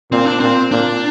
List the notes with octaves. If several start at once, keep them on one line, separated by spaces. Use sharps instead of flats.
A#2 C4
D4
A#2 C4
A#2 D4